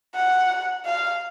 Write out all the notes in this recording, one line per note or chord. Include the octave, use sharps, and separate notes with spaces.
F#5
F5